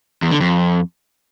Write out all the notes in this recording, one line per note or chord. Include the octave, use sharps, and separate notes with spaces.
E2
D3
F2